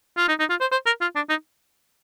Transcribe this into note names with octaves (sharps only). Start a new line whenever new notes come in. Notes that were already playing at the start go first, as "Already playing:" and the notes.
F4
D#4
D#4
F4
C5
C5
A#4
F4
D4
D#4